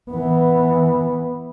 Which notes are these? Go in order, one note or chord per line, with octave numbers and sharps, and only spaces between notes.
E3 B3